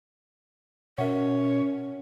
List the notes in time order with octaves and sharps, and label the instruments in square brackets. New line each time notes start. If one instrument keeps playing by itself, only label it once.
[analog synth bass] B2 [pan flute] C#4 [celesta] A#4 E5 F#5 [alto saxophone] C#5